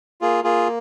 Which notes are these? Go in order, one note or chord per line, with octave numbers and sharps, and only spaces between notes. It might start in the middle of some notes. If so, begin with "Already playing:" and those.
A#3 F4 G#4
A#3 F4 G#4